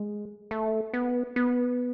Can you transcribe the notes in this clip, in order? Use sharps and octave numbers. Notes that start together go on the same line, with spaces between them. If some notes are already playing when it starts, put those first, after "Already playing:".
Already playing: G#3
A3
B3
B3